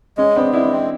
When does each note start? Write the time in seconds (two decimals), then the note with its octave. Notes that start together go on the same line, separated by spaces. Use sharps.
0.17 G#3 C#4
0.36 B3 C4 D4
0.54 G#3 D4 E4
0.72 C4